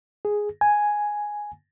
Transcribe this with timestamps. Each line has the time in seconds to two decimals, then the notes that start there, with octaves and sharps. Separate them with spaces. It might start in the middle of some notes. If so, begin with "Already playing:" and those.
0.25 G#4
0.61 G#5